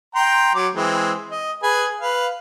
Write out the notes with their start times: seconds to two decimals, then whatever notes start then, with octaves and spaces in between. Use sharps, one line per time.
0.15 G5 A#5 C6
0.55 F#3 D6
0.75 E3 G#3 C4
1.31 D#5
1.63 G#4 B4 G#5
2.01 B4 F5